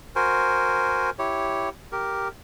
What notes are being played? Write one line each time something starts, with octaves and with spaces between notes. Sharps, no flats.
F#4 A#4 C5 G#5
E4 G4 C#5
G4 A#4